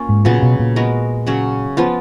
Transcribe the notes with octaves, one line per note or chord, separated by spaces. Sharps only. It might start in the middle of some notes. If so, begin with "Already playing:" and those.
Already playing: A#3 C#4 F4
G#2
A#2 C#3 F#3 B3 F4
B2
A#2
G#3 B3 F#4 A#4
C#3 F#3 C#4
F3 B3 F4